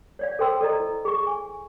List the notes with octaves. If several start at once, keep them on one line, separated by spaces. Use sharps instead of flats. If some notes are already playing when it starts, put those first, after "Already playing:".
C#5 D5 F5
A4 C5 G5 C6 E6
A4 D5 D#5 A#5
E4
G#4 C#6
G#5